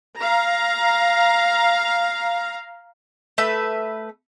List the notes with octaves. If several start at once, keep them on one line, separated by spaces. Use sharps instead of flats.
F5 A#5
A3 B4 E5